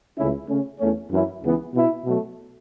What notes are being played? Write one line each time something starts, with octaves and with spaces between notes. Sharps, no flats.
C#2 C#3 A3 C#4 E4
C#3 A3 C#4
E2 E3 A3 C#4
F#2 E3 C#4 E4
C#2 C#3 E3 B3
B2 B3 E4
B2 F#3 A3